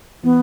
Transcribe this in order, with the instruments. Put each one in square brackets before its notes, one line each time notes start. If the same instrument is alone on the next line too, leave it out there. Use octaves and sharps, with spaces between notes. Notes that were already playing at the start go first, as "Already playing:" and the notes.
[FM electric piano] E3 [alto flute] B3